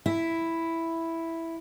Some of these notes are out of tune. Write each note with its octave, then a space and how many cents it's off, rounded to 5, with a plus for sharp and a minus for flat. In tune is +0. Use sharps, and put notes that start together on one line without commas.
E4 +0 E5 +0